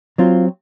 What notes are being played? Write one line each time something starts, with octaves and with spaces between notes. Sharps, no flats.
F#3 C4 F4